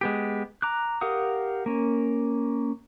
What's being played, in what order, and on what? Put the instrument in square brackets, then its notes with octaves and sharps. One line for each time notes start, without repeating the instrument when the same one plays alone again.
[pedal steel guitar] G#3 B3 G4
A#5 D6 F#6
G4 A#4 F5 F#5 D#6
A#3 C#4